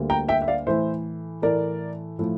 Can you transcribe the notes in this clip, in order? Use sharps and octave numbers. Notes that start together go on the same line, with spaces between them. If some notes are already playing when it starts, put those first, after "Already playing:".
Already playing: D2 D3 G3 A#3
G5 A#5
E5 G5
E5
D5 F5
A2 E3 A3 C5 E5
A2 E3 A3 A#4 D5
A2 F3 A3